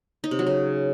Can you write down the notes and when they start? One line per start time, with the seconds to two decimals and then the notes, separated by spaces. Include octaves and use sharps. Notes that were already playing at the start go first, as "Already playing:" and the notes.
0.24 D#4
0.31 C3
0.39 F#3
0.47 C#3